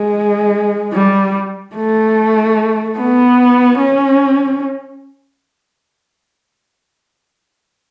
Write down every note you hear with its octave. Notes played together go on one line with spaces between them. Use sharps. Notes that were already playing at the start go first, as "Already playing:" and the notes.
Already playing: G#3
G3
A3
B3
C#4